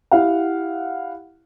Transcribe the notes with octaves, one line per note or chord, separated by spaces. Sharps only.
E4 G4 F5 F#5